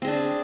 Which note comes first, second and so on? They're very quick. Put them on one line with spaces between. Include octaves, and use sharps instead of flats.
C4 G#4 D4